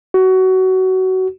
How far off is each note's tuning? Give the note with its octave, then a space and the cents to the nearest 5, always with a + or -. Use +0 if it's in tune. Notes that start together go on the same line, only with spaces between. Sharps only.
F#4 +20